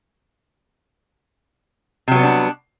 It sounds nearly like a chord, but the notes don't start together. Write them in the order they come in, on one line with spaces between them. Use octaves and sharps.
C3 F#3 B3 G3 D4